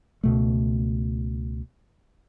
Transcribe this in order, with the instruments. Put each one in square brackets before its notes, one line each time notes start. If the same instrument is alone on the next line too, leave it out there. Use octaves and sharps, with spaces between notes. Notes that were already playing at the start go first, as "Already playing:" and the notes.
[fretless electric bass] C#2 B2 A3